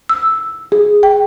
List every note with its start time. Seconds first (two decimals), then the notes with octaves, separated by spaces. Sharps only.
0.09 E6
0.72 G#4
1.03 G5